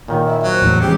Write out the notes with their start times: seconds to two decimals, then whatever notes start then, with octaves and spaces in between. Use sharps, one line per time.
0.08 A#2 D#3 C#5
0.25 E5
0.43 F#3 C5
0.61 E2 A2
0.81 E3 G#3 C#4 G4 G#4